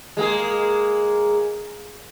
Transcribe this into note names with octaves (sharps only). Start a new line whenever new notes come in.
G#3 A#3 G#4